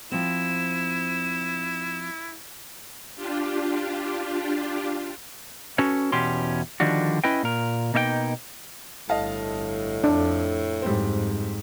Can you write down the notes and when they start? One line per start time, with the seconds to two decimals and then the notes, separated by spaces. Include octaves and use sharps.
0.12 F3 C4 E4 E7
3.15 D4 F4 G4
5.78 C#4 F#4 A4 B4 C#5
6.12 E2 B2 C#4 G4 C6
6.80 D3 D#3 F3 G3 D4 F#4
7.24 C#4 E4 B4 D#5 G5
7.43 A#2 A#4
7.94 B2 A#3 D#4 E5 G5
9.09 G1 A2 D#5 F5 A5
10.04 F2 D4
10.82 F2 G#2 G3 C4